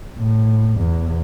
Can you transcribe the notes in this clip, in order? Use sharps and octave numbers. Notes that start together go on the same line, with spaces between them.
A2
E2